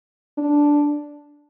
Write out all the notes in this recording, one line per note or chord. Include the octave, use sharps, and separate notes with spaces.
D4